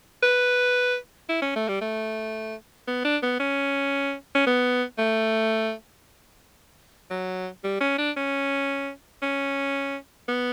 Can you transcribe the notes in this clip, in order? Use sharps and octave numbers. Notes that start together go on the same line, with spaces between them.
B4
E4
C#4
A3
G3
A3
B3
D4
B3
C#4
C#4
B3
A3
F#3
G3
C#4
D4
C#4
C#4
B3